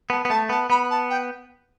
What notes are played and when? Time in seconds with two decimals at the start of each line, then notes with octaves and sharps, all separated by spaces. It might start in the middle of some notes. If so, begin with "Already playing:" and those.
0.10 B3 A5
0.25 B3
0.30 A3 A5
0.49 B3 A5
0.70 B3 B5
0.90 A5
1.10 G5